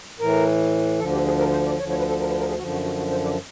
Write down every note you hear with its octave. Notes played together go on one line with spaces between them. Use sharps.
A2 E3 A#4
D2 D3 F3 A4
G4
G#4
A#4
C5
D5
D2 D3 F3 C#5
C#5
B4
A4
A#4
B4
A#4
G#4
F#2 D3 F3 F#4
F#4
F#4
F#4
C5
D5